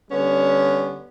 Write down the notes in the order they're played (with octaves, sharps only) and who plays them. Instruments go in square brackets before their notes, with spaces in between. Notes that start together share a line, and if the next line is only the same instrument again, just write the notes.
[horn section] D3 G3 B3 C#4